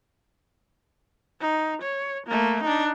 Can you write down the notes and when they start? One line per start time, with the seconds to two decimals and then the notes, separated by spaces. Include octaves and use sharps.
1.41 D#4
1.82 C#5
2.27 A3 A#3
2.63 D4 D#4